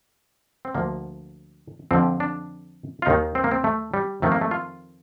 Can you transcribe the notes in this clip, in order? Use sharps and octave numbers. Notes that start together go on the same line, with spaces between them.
C4
D2 D3 F3 A#3
F2 D3 F3 C4
D4
F4
D#2 D#3 D#4
C4
A#3
C4
A3
G3
F2 D#3 A3
A#3
A3
F4